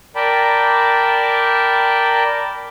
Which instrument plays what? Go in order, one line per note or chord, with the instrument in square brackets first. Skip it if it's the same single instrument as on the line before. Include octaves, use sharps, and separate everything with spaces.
[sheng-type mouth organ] A#4 D5 G5 A5 B5